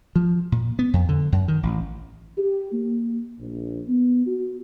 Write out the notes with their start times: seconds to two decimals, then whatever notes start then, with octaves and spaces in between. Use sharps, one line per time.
0.16 F3
0.52 A#2
0.79 B3
0.93 F2
1.09 D3
1.32 F#2
1.48 D#3
1.63 A1
2.38 G4
2.72 A#3
3.39 A#1
3.88 B3
4.27 F#4